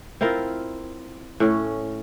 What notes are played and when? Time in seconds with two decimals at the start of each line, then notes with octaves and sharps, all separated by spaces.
0.21 C4 E4 F4 A#4
1.40 A2 C#4